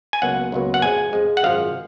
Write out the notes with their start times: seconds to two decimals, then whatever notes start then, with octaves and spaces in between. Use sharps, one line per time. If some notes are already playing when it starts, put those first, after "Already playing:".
0.13 G#5
0.22 C#2 B2 F#3 A#3 F#5
0.52 C#2 B2 F#3 A#3
0.74 F#5
0.82 F2 F3 G#3 G#5
1.13 F2 F3 G#3
1.37 F#5
1.43 G#1 F#2 F3 G#3 F5